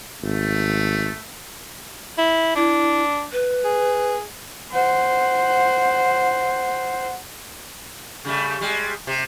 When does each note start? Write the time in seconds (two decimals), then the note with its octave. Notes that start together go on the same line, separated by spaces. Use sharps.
0.23 G#1 A3
2.18 E4
2.56 D4 E4
3.32 B4
3.65 G#4
4.72 C5 F#5
8.25 C#3 G3 A3
8.61 G3 G#3
9.07 C3